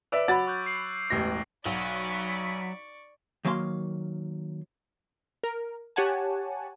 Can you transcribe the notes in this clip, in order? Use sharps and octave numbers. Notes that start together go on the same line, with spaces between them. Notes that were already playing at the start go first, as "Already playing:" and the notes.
B4 D5 E5 D6 E6 D7
F#3 B5 A6
C#6 F#6 G6
C7 D7 F#7
E1 A1 A#6
B1 F#3 D5 B5 C#6
D#3 F#3 A#3 F5 A#5 C6
A#4
G4 C#5 F#5 G#5 A5